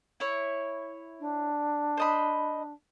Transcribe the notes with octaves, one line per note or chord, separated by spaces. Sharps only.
E4 C#5
D4
C5 D#5 B5